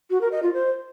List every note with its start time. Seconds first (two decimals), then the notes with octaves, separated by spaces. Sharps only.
0.10 F#4
0.21 A#4
0.32 D#5
0.43 F4
0.53 C5